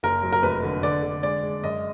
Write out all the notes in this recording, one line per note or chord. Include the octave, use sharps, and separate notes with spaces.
F#1 A#4
F#3
A#4
F1 B4
D3
D3 D5
D3
G#3 D5
G#3
F#2 D#5